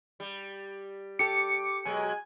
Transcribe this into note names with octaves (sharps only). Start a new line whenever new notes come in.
G3
G4 A4 D6 C#7
B2 F#3 G#3 G#5